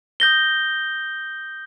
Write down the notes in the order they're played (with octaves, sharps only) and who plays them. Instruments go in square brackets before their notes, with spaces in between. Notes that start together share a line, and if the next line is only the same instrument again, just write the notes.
[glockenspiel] D#6 G6 A#6 G7